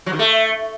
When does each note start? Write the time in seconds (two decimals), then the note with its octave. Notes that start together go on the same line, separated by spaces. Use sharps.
0.06 F#3
0.13 D#3
0.19 A3